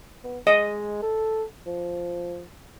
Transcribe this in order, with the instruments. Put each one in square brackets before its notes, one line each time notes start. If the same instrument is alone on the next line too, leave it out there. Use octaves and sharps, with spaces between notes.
[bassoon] B3
[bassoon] G#3 [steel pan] D#5
[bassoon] A4
F3